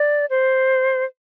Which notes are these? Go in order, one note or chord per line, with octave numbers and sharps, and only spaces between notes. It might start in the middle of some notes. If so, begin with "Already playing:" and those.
Already playing: D5
C5